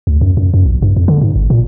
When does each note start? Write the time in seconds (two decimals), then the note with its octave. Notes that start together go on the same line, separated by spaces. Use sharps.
0.07 D2
0.21 F#2
0.37 F#2
0.54 F#2
0.66 A#1
0.82 G2
0.97 F2
1.08 D3
1.22 G#2
1.36 G#1
1.50 A#2